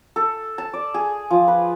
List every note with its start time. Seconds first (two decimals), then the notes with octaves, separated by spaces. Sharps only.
0.16 A4
0.58 A5
0.74 D5
0.94 G#4
1.30 F3
1.48 B4